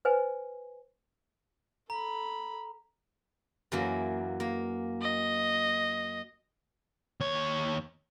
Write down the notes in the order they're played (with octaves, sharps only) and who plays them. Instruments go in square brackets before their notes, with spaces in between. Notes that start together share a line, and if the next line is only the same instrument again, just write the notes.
[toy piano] B4 C5 D#5 G#5
[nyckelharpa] A4 B5 [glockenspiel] A#5
[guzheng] F#2 E3 A#3
A#3
[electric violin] D#5
[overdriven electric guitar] D#2 C#5